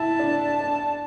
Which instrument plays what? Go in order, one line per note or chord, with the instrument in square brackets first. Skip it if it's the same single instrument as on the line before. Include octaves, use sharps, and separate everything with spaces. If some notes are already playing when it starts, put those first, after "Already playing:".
Already playing: [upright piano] E4 [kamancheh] A5
[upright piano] D4
D4